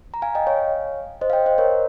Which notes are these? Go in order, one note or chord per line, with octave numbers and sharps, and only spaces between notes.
A#5
F5 G#5
D#5 G5
C#5 F5
C5 D#5
F5
D#5 G5
C5 D#5
A#4 C#5